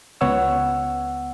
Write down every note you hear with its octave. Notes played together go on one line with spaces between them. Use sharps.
C#2 B3 C#5 F#5 E6